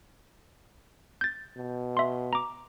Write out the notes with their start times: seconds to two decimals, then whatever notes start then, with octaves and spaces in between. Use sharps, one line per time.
1.21 G6 A6
1.56 B2
1.97 E5 C6
2.33 A#5 D6